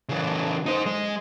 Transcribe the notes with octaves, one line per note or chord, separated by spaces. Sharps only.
C#3 E3
D#4 C5
G#3